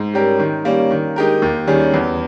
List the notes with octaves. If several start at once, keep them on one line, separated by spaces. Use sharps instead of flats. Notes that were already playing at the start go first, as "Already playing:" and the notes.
Already playing: G#2
G3 C#4 G4 A#4
D#3
G3 A#3 C#4
D#3
G#3 D#4 G4 A#4
D#2
D#3 G3 C#4 G#4
E2